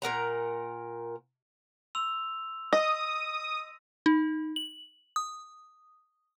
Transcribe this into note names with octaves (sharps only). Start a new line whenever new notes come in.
A#2 A#4 F#5 A#5
C6 E6 F7
D#5 D#6 A#6
D#4
F#7
D#6